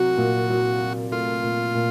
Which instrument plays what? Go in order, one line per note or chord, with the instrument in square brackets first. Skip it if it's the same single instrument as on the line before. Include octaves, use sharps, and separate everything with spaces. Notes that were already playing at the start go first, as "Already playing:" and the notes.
Already playing: [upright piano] C2 F#3 [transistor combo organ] F#4
[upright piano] A#2
F#3
F#3
[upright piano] A3 [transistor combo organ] F4
[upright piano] A#2
A#2